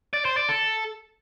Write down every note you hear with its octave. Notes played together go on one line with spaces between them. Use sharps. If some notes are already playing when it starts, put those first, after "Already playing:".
D5
C5
D5
A4